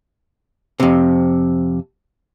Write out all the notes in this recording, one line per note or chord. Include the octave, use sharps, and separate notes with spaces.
F2 C3